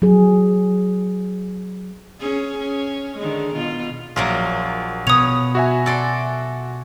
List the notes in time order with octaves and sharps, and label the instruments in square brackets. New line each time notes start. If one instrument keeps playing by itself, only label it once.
[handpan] F#3 G#4
[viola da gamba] C#4 G#4
C#4
D3 D#3 G#3
B2 F4
[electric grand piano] A#1 [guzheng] F#3 A#3 F4
[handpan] B2 [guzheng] B4 C#5 [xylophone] D#6 F7
[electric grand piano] F#4 E5 G#5
[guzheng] A4 D5 C6